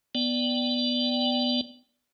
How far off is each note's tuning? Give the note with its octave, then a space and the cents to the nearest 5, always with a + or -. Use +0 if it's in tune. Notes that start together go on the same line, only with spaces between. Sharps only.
B3 +0 D5 +0 G5 -10